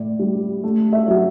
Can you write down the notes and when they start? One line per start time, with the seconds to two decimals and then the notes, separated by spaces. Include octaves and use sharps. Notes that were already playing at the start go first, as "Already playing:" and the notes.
Already playing: A2 D5
0.19 G3
0.64 A3
0.93 E5
1.08 F#3